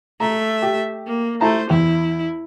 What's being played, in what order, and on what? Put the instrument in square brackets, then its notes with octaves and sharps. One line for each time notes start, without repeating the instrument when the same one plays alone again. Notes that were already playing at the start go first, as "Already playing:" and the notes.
[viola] A3 E5 [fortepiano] A#5
[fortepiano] G4
[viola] A#3
[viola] A3 C5 [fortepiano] E4 A5 A#5
[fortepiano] E2 [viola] E4